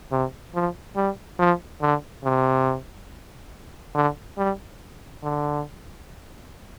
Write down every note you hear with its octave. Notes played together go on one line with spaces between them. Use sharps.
C3
F3
G3
F3
D3
C3
D3
G3
D3